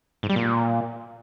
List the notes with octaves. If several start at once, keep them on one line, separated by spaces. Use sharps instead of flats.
G#2
G3
A#2